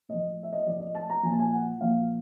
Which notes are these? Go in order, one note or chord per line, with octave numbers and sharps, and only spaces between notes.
A2 F3 D#5
E5
D#5
A2 F3 D5
D#5
A5
A#5
A#2 F3 G#5 A5
G#5
F#5
A#2 F3 F5